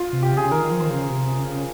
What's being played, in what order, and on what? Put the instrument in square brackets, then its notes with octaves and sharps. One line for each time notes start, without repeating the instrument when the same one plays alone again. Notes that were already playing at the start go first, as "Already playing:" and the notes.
Already playing: [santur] F4
[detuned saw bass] C3
[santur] G4
[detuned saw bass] C#3
[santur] G#4
[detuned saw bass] C#3
[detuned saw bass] D#3 [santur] A#4
[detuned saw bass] D#3
F3
[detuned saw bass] D#3 [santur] C5
[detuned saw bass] C#3
C3
C#3